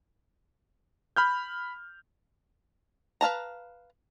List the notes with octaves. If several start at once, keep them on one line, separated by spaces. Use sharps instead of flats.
B5 F6 G6
B4 F5 A5 A#5